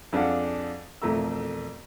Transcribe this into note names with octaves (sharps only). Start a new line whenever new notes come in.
F2 D4 G#4 F5 F#5
E1 F2 A3 A#5 E6